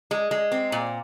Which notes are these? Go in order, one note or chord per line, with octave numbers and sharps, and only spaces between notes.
G#3
G#3
C4
A#2